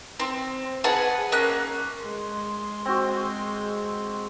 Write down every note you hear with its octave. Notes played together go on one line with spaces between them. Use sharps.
C4
G#4 B4 F#5 A5
A#3 C#4 F#6
G#3 C6
C4 F#4